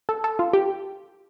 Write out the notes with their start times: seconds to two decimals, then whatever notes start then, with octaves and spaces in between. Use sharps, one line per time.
0.09 A4
0.24 A4
0.39 F4
0.53 G4